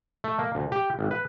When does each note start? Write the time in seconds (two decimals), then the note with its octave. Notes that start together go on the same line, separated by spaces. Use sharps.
0.24 A3
0.39 A#3
0.55 D2
0.72 G4
0.99 G#1
1.11 B4